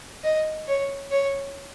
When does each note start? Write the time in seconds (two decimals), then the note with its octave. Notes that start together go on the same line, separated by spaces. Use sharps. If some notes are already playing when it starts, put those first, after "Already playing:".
0.24 D#5
0.68 C#5
1.11 C#5